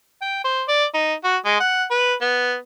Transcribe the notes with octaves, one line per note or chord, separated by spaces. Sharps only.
G5
C5
D5
D#4
F#4
G#3
F#5
B4
B3